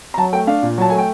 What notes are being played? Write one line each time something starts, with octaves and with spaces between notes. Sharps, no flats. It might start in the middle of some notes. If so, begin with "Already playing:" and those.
A#5
F#3 A5
A3 G5
D4 F5
A#2
F#3 A5
A3 G#5
G5